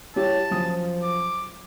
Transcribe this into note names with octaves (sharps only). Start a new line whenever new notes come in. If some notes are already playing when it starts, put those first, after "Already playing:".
G3 E4 G4 C#5 A5
F#2 F3 D#6
D6